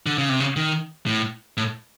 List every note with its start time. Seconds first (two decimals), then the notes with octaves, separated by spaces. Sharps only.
0.06 D3
0.18 C#3
0.29 C3
0.40 C#3
0.56 D#3
1.06 A2
1.57 A2